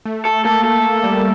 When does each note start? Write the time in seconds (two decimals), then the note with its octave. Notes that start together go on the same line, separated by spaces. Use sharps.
0.05 A3
0.25 A4
0.45 A#3 A4
0.64 A4
1.04 G3